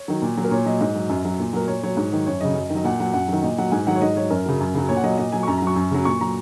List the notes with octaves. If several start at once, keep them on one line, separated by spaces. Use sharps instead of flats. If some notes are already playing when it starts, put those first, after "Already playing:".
Already playing: C#5
D#3 F#3
A#2
F#3
A#4
A#2 C#5
F#3 D#5
G#2 D#5
F#3
F#2
F#3
A#2
F#3 A#4
A#2 C#5
F#3 C#5
G#2
D#3 F#3
F#2 C#5
C#3 F#3 D#5
F#2
D#3
F#3 D#5
A#2 F#5
F#3 F#5
F#2 F#5
D#3 F#3
A#2 D#5
F#3 F#5
G#2 G#5
D#3 F#3 F#5
C#5
G#2 D#5
F#3 C#5
F#2 A#4
C#3 F#3
F#2
C#3 F#3
A#2 C#5
F#5
F#3 D#5
A#2 D#5
F#3 G#5
C#6
F#2 A#5
A#5
F#3 C#6
F#2
C#3 F#3
A#2 C#6
F#3 A#5